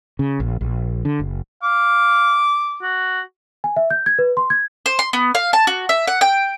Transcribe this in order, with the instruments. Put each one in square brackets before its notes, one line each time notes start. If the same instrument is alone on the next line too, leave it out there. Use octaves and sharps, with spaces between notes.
[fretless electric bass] C#3
A#1
A#1
D3
F#1
[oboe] F5 [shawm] D6
[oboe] F#4
[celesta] G#5
E5
G6
G#6
B4
C6
G#6
[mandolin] C5
C6
B3
F5
A5
F#4
E5
F#5
G5